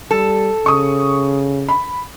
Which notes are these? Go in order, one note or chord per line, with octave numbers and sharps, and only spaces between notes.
G3 A4
C#3 C#6 D#6
B5